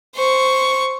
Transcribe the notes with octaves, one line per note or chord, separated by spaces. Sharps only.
C5 C#6